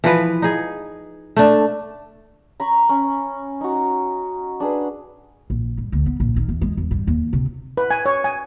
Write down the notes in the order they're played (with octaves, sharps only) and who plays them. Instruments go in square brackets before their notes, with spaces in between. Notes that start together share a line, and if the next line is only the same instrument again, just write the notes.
[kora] E3 F3 B4
D#4 G#4
A3 D4
[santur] A#5 B5 C#6
C#4
D#4 F#4
D4 G#4 B4
[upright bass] A#1
G2
D2
B3
A#1
D#3
E2
G#3
E2
G2
D#2
C3
[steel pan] B4
G#5
C#5
G#5